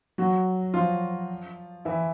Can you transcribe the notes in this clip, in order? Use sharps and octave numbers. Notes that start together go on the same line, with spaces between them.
F#3 F#4
F3 F4
E3 E4